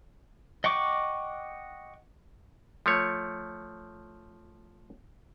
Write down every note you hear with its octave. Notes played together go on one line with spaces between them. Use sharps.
D#5 F#5 G5 C#6 D6
F3 A3 C#5